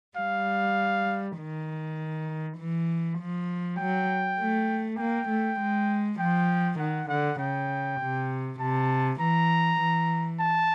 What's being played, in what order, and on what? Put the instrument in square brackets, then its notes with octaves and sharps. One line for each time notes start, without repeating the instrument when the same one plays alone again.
[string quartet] G3 [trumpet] F5
[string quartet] D#3
E3
F3
[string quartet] F#3 [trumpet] G5
[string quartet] A3
[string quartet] A#3 [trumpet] G5
[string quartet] A3
G#3
[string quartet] F3 [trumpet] G5
[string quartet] D#3 [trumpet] F#5
[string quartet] D3 [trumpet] F#5
[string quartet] C#3 [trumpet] G5
[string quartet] C3
[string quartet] C3 [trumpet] A5
[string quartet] E3 [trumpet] A#5
[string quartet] E3
[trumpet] A5